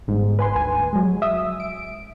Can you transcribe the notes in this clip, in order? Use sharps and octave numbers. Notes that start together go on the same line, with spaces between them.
G1 G#2
B4 G#5 C6
D2 G#5
F#3 G#3
E5 D#6 E6
D7